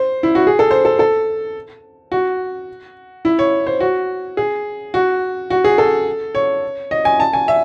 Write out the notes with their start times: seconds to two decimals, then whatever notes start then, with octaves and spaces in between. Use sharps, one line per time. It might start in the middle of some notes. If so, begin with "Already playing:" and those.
Already playing: C5
0.23 E4
0.35 F#4
0.47 G#4
0.59 A4
0.71 C5
0.85 A4
0.99 A4
2.12 F#4
3.25 E4
3.39 C#5
3.67 C5
3.80 F#4
4.37 G#4
4.94 F#4
5.50 F#4
5.64 G#4
5.78 A4
6.35 C#5
6.91 D#5
7.05 G#5
7.20 A5
7.33 G#5
7.48 E5